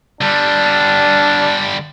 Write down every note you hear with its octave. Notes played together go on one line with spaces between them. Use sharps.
D3 G3 D4